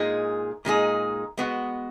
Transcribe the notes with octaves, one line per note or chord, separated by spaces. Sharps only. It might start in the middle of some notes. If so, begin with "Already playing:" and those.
Already playing: A#2 G#3 D#4 G#4
A#2 G#3 D#4 G#4
G#3 B3 F#4